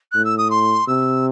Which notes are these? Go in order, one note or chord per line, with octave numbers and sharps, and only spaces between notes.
A2 F#6
E6
D#6
C6
C3 E6